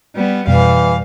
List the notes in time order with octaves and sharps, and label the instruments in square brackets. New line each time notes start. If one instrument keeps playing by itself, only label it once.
[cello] G3 B3
[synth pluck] F2 B2 [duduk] E3 [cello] G3 F5